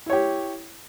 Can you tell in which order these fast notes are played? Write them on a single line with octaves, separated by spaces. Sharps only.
E4 C#5 G4